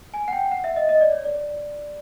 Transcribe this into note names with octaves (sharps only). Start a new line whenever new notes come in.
G#5
F#5
G5
F#5
E5
D#5
D#5
D5
C#5
D5